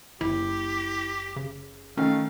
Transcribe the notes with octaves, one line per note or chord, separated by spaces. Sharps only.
F#1 E4 G4
C#3
D#3 A3 C#4 F5